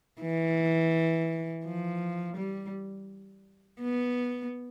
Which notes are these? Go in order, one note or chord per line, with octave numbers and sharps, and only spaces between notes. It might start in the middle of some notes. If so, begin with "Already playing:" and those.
E3
F3
G3
B3